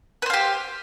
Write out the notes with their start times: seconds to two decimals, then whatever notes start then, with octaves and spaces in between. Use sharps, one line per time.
0.22 B4
0.26 C5
0.30 F5
0.34 G4